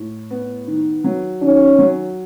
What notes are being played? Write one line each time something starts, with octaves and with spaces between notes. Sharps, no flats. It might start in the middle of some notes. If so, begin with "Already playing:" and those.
Already playing: A2
B3
D#3
F#3
D#3 C#4
F#3